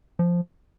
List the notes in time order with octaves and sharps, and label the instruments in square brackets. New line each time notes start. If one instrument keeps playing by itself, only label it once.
[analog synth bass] F3